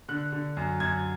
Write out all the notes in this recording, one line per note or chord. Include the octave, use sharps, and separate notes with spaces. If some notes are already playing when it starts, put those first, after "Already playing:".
D3 F#6
D3
F#2
F#2 G#6